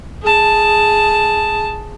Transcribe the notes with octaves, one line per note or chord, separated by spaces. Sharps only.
G#4 A5